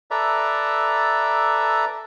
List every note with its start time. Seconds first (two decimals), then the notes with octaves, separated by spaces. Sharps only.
0.11 A4 B4 D5 E5 A#5